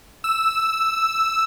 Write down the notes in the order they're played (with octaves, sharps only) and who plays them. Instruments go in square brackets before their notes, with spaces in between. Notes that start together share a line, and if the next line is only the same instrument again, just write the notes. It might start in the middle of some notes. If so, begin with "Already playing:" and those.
[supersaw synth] E6